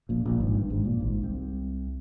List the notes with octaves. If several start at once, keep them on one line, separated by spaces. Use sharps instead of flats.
A#1 A#2
A#1 A#2
G#1 G#2
G2
G#1 G#2
A#1 A#2
G#1 G#2
C2 C3